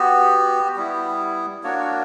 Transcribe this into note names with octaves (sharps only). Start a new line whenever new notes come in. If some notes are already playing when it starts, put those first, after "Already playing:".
Already playing: B3 F#4 G4
G3 B3 E4
A#3 D4 F#4 C#5
C#5